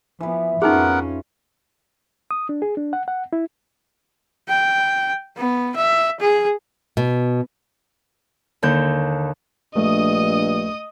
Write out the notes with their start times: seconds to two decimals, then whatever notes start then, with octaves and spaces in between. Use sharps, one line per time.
0.20 E3 F3 B3 B4
0.62 F2 B3 C#4 D#4 F4 G#4 A#4 F#5
2.31 D#6
2.49 D4
2.62 G#4
2.77 D4
2.93 F#5
3.08 F#5
3.33 E4
4.49 G5
5.37 B3
5.76 E5
6.20 G#4
6.97 B2
8.63 D#2 D3 G6
9.76 A#1 G2 A3 D#5 D#6